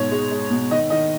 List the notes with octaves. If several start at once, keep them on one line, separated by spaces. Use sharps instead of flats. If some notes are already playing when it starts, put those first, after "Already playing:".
Already playing: G#2 B2 C#5
G#3
G#3
B2
D#3 D#5
D#3 D#5